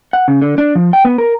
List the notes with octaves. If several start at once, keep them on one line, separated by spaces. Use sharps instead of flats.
F#5
C#3
D3
D4
F3
G5
B3
A#4